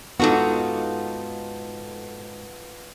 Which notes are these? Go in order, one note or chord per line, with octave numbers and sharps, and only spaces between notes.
G#2 B3 D#4 F4 F#4 A4